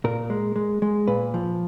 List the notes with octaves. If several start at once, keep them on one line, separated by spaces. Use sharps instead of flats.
A#2 A#4
G#3
G#3
G#3
A#2 B4
F3